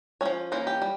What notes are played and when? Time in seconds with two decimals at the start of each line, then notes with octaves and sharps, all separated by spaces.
0.21 A#3 C#4 C#5
0.25 F3
0.52 E3 A#3 C#4 C5
0.67 G4
0.82 G3